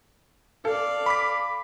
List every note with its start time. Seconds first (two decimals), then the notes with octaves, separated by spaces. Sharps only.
0.65 A4 D5 F5
1.06 B5 D6 B6